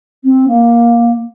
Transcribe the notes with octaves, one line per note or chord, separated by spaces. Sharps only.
C4
A#3